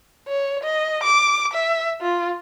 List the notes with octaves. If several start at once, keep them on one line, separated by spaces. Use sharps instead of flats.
C#5
D#5
D6
E5
F4